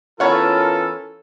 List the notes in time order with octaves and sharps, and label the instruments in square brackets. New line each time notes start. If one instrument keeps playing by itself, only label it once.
[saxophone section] E3 C#4 F4 [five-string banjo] B3 C#5 F#5 [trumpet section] A4 [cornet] A#4